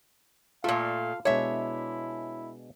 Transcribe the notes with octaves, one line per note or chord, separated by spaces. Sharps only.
A#2 A3 F4 A4 F5
B2 G#3 D4 E4 C#5 E5